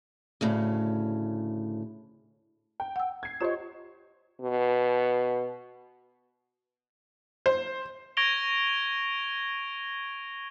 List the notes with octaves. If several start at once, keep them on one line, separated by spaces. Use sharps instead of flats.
D2 A2 C#3
G5
F#5 E6
G#6 C7
F4 G4 C5 C#5 D#5
B2
C5
C#6 G#6 A#6 D7 F7 G7